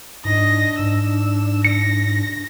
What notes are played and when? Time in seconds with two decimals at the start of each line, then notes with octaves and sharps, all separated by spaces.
0.25 G#2 D4 D#5 A#6
0.79 G#2 E6
1.65 A#6 C#7